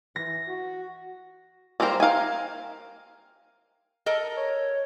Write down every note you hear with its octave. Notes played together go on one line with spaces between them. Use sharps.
E3 A#6
F#4
G3 A#3 C4 A#4 C5
A#4 F5 G5 G#5
A4 A#4 D#5
C#5